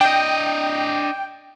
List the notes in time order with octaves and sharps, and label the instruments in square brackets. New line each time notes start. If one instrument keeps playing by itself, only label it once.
[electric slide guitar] D4 D#5 [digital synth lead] G5